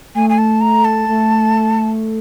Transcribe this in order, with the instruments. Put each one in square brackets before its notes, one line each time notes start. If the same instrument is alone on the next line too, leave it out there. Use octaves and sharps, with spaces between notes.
[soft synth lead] A3 [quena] G#5
[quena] G#5
A5
A#5
A5
[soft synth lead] A3